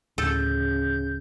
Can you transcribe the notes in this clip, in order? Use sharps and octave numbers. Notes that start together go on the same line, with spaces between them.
D1 C#3 A4 G6